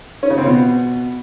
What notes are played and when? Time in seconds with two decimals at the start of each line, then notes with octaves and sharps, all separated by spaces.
0.23 C#4
0.30 C#3
0.38 C4
0.45 B2